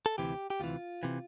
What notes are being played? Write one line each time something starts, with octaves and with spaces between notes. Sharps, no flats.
A4
D2 C3 E3 G4
G4
D2 C3 E3 F4
C3 E3